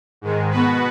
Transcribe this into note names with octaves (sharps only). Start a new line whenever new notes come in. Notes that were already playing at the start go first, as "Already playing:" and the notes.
G#2 D#3 G#3
B2 B3 F#4 B4